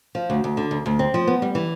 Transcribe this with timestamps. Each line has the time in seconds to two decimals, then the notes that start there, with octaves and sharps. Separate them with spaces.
0.15 F3
0.30 D2
0.44 D2
0.57 D3
0.71 D2
0.86 D2
0.99 C4
1.14 F3
1.27 B3
1.42 G3
1.55 E3